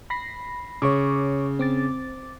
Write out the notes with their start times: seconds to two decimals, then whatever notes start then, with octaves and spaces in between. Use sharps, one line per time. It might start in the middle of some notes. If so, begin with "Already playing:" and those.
0.10 B5 A#6 C7
0.82 C#3 C#5 C#6 D6
1.59 C4 D6 A6